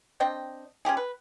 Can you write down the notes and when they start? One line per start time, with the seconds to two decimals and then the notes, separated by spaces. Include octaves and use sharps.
0.20 C4 D4 D#5 G5
0.85 C#4 F4 G4 G#4
0.97 B4